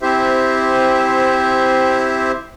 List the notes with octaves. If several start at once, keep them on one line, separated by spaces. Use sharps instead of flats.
C4 E4 G4 C5 E5